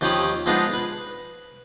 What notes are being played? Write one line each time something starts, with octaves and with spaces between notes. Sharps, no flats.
D#2 F3 C#4 G4 B5 D#6
F3 G#3 B3 D4 D#4
B4